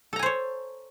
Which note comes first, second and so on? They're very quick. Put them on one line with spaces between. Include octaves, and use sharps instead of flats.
A4 A#5 G#5 C5 C#5